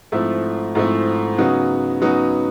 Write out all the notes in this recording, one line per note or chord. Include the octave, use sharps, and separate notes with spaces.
G#2 F3 A3 C4 E4
G#2 F3 A3 C4 E4
C#3 F#3 B3 D#4
C#3 F#3 B3 D#4